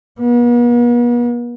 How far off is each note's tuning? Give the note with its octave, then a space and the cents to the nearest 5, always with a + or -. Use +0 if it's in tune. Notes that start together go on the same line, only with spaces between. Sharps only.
B3 -45